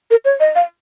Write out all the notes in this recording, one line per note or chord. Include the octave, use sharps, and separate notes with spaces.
A#4
C#5
D#5
F5